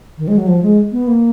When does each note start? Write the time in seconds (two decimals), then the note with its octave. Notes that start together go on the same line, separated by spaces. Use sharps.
0.18 D#3
0.28 G#3
0.37 F#3
0.47 F3
0.63 G#3
0.92 B3
1.07 A#3